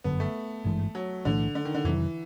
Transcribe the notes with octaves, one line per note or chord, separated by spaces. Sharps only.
G1 F#2 D3 B3
A3
G#1 G2 E3 G#3
F#3
B1 A2 D3 E3 A3
D3
D#3
D3
F2 C3 D#3 E3 F#3